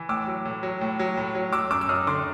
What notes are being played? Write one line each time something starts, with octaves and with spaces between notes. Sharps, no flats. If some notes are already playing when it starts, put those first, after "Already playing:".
Already playing: E3
A2 D6 E6
F#3
A2
F#3
A2
F#3
A2
F#3
F#3 D6 E6
F#2 D6 E6
E6
F#2 D#6 F6
D3 C6 D6